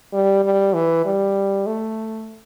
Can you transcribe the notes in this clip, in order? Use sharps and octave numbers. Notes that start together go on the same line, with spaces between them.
G3
G3
E3
G3
A3